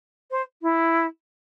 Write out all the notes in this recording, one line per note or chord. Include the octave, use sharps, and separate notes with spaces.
C5
E4